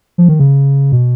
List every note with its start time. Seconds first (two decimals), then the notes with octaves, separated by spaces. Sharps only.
0.18 F3
0.29 D#3
0.40 C#3
0.92 B2